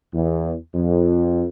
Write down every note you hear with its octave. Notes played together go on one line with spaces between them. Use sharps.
E2
F2